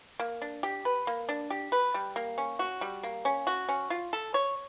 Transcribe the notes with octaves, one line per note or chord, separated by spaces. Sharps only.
A#3
D4
G4
B4
A#3
D4
G4
B4
G3
A#3
C#4
F#4
G3
A#3
C#4
F#4
C#4
F4
A4
C#5